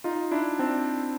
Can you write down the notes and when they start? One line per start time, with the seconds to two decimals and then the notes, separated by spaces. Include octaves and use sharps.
0.04 D#4 F4
0.31 D4 E4
0.59 C4 D4